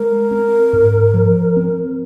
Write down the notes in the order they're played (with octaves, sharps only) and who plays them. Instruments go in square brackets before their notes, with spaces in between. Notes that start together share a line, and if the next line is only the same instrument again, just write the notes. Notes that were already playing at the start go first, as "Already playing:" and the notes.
Already playing: [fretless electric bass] G#3 [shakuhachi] A#4
[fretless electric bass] C4
G#2
F3
C4